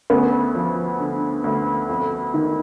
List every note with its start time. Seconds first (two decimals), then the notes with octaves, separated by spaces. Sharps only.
0.10 D2 B3 C#4
0.55 F3
0.99 D3
1.44 D2
1.89 F2
2.34 D#3